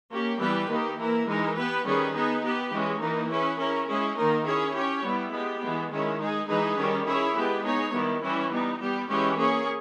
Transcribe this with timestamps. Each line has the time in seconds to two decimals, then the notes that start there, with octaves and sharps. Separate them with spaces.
0.11 A#3 C#4 G4
0.40 E3 G3 B3 G4 B4
0.69 D#3 A#3 D#4 G4
0.98 E3 A#3 E4 A#4
1.27 E3 G#3 D#4 A#4
1.56 B3 G4 B4
1.85 D#3 G3 C#4 G#4 B4
2.14 B3 D#4 G#4 B4
2.43 B3 G4 B4
2.72 E3 G#3 C#4
3.01 E3 A#3 D#4 A#4
3.30 C#4 E4 G#4 B4
3.59 C#4 E4 A#4
3.88 G#3 C#4 E4 G#4
4.16 D#3 A#3 D#4 A#4
4.45 C#4 E4 G#4 C#5
4.74 C#4 G4 C#5
5.03 G3 B3 E4
5.32 G#3 B3 G4
5.61 E3 G#3 B3
5.91 D#3 G#3 C#4 E4
6.20 G#3 D#4 G#4
6.48 E3 G#3 D#4 G#4 B4
6.77 D#3 G3 C#4
7.06 C#4 E4 G#4 C#5
7.35 G#3 B3 G4 B4
7.64 B3 D#4 G#4 C#5
7.93 D#3 G3 B3 E4
8.21 E3 G3 C#4 E4
8.51 G3 B3 D#4
8.80 G3 B3 G4
9.09 E3 G#3 C#4 G4
9.37 A#3 C#4 G#4 C#5